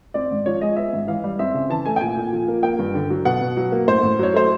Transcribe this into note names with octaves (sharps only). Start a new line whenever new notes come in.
C4 D5
G#2
F3 C#5
G#3 D#5
B3 E5
G#2
E3 F5
G3
C4 E5
C#3
E3 A5
A3 G#5
G5
A#2 G#5
A#2
F3
A#3
A#3 G5
G2
D3
F#3
B2 F#5
B2
F#3
A#3
A2 C5
A2
F#3 C#5
A3 C5